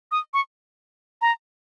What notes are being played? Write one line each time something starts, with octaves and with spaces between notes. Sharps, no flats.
D#6
C#6
A#5